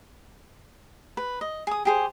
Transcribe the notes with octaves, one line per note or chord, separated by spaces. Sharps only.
B4
D#5
G#4 D#6
G4 G#4 C5